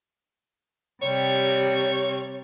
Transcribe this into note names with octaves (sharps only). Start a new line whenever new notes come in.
C3 G3 C#5